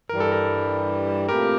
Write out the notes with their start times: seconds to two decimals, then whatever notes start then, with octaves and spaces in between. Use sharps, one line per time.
0.09 G2 E3 G3 A#4
0.20 A4
0.32 A#4
1.29 A#2 A3 C4 G4 A#4